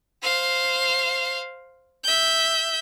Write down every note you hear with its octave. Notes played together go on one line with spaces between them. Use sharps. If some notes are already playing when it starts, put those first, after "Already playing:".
C5 F5
E5 G6